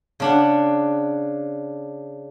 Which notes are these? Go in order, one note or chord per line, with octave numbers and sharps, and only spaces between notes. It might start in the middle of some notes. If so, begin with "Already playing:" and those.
C#3 D4 F#5